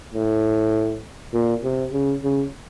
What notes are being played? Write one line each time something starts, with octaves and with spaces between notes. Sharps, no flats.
A2
A#2
C3
C#3
C#3